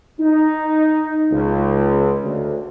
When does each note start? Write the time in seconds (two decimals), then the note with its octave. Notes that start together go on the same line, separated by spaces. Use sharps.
0.19 D#4
1.32 C#2
2.24 D2